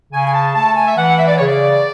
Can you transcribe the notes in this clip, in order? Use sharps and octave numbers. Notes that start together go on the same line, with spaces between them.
C#3 G#5
G#5
A5
A3 A5
G#5
E5
E3 F#5
E5
D5
C#3 C#5
D5